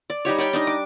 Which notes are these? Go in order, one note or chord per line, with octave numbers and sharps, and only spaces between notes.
D5
G3 D#4 G4 C#5
C#5 D5 G5
D4 D#4 D#5
D6